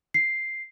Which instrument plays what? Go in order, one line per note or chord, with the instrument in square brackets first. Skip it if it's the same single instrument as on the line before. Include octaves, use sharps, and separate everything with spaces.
[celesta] C7